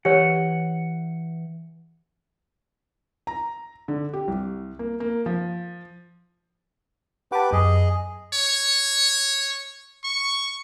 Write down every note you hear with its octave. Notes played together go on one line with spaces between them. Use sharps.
E3 G4 C#5 F#5
A#5
D3
G4
C2
A#3
A#3
F3
G4 B4 F#5 A5 D6
F#2 G#4 D#5
C#5
C#6